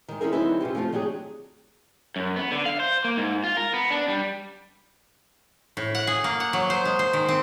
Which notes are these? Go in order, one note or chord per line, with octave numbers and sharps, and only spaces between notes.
D#3 G#3
C4 C#4 D#4 E4 G#4 A#4
D3 F#3 C4 D#4 E4 B4
C3 C#4 F4 G4
F3 A3 C4 F4
D#3 F#3 D4 G4 G#4
F#2
B3
D3
F5
C5
A#3
G#2
F4
A#4
B3
D4
G3
A2
F#5
G#4
A#3
F#5
F#3
C5
G#3
C5
D#3
C4